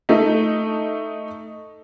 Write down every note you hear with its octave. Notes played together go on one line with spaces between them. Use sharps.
A3 D#4